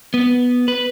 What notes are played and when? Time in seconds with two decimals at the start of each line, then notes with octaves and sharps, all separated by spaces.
0.14 B3
0.68 B4